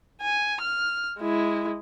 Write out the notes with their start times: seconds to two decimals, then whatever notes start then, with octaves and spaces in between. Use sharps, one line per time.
0.22 G#5
0.61 F6
1.20 G#3 E4